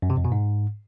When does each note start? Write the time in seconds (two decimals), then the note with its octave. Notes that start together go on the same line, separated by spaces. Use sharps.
0.02 F#2
0.10 C3
0.17 F2
0.25 B2
0.32 G#2